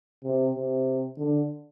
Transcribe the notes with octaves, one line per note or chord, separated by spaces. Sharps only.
C3
C3
D3